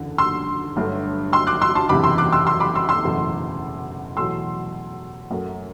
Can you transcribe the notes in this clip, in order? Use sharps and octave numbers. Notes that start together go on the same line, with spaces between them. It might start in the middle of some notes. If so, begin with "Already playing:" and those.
Already playing: F#1 E2 D3
C6 E6
G1 G2 F#3 A3
C6 E6
D6 F#6
C6 E6
A5 C6
F#1 E2 C3 E3 B5 D6
C6 E6
D6 F#6
C6 E6
C6 E6
B5 D6
C6 E6
C6 E6
F#1 E2 B2 A3
E2 B2 F#3 A3 C6 E6
F#2 F#3 A3